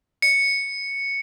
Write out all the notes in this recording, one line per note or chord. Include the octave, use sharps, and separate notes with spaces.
C#7